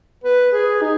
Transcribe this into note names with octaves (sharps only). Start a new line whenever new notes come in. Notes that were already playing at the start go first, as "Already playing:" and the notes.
B4
G#4
D#4